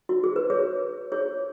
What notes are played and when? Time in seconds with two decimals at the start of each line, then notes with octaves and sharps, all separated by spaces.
0.09 F#4
0.24 G#4
0.36 B4
0.50 G#4 C#5
1.12 G#4 C#5